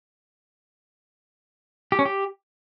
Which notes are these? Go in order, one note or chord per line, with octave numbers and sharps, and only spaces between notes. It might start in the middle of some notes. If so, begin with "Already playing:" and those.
G4
C#4
G4